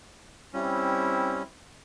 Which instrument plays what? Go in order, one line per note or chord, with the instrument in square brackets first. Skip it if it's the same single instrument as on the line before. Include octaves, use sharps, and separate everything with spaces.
[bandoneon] G3 C#4 [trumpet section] C4 E4